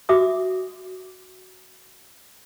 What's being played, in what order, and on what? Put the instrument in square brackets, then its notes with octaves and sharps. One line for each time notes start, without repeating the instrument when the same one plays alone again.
[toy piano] F#4 E5 D6 D#6